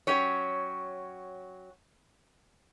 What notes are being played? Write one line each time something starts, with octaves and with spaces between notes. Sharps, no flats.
F#3 C#4 G4 C#5